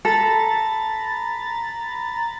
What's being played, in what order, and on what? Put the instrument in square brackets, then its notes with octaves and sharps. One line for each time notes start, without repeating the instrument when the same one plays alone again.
[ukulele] A4 [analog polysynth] A#5 B5 A6